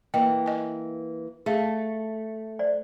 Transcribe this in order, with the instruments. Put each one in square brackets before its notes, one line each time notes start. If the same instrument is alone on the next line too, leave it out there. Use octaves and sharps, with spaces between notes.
[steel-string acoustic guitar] E3 A#3 [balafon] D#5 [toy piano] G5
[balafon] D#5 G#5
[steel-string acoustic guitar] A3 [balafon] G#4 F5 [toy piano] E5
[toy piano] C5 D5